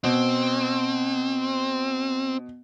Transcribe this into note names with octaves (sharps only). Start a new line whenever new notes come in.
B2 C4